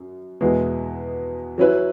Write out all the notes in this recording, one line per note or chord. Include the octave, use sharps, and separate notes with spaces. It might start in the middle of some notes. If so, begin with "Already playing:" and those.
Already playing: F#2
E2 B2 G#3 B3 E4
F#3 C#4 E4 B4